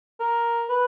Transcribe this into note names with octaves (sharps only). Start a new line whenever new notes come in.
A#4
B4